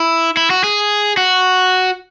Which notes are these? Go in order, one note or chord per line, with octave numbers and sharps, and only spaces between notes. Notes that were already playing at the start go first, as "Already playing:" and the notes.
Already playing: E4
E4
F#4
G#4
F#4